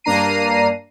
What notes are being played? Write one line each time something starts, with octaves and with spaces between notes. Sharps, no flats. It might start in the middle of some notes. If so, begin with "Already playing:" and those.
G2 A#3 D4 A#5 C7 D#7